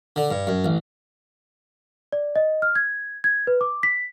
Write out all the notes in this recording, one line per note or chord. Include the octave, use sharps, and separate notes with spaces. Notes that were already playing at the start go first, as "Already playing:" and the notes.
D3
G2
F#2
A1
D5
D#5
F6
G#6
G#6
B4
D6
B6